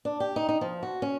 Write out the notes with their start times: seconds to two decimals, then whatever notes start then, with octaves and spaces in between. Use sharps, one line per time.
0.05 D4
0.20 G4
0.36 D#4
0.49 D#4
0.61 F3
0.83 F#4
1.02 C#4